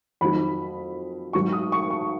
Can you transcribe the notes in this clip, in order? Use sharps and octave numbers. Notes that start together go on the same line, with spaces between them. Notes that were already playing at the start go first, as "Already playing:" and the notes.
F2 D#3 F#3 B5
G#2 F#3 C#6
D#6
C#6
C#6